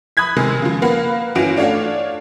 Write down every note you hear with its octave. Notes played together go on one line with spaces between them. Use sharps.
B5 D#6 F#6 G#6 B6
C3 D#3 G#3 G#4
C#3 F3
A#3 A#4 B4 F5 F#5
G1 E3 C#4 F#4 D7
A3 D4 F4 C#5 F5 F#5